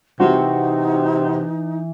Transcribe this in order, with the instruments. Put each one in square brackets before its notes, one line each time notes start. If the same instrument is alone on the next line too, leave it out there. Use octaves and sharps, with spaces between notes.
[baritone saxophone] C3 [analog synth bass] E3 [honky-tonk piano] C4 F#4 [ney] D#4